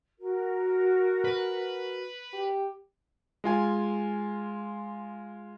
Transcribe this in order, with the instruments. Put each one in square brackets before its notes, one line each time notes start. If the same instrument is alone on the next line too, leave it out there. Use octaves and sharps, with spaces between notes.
[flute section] F#4 A#4
[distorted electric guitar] B4
[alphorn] G4
[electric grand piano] G#3 F4 G#5